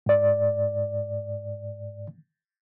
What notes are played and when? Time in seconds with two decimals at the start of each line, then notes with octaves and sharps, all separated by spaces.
0.06 G#2 D5